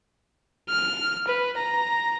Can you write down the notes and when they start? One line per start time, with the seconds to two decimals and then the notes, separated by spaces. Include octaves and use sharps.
0.70 F6
1.28 B4
1.57 A#5